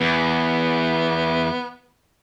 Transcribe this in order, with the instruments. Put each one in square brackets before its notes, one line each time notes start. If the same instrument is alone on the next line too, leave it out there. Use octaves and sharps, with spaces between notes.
[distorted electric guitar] E2 [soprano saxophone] B3